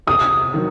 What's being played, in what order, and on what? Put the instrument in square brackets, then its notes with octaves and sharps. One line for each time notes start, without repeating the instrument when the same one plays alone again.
[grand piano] C3 [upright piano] D#6
[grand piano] D#3 F#3